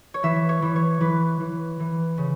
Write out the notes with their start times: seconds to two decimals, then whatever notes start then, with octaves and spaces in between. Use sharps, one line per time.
0.14 C#5
0.23 E3 E5
0.49 C#5
0.62 E3
0.76 C#5
1.01 E3 B4
1.40 E3
1.80 E3
2.18 C#3